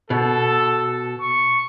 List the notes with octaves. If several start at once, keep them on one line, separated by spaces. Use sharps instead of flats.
B2 A4
C#6